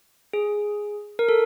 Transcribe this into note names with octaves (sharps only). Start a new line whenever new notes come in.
G#4
A#4
A4